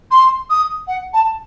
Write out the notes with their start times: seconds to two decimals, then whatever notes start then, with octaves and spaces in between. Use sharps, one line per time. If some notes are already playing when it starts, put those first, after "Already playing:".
0.11 C6
0.50 D#6
0.87 F#5
1.13 A5